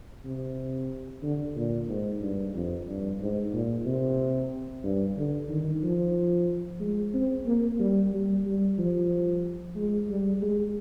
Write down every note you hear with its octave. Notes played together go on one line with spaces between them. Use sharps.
C3
D3
A#2
G#2
G2
F2
G2
G#2
A#2
C3
G2
D3
D#3
F3
G#3
C4
A#3
G3
G3
G3
F3
G#3
G3
G#3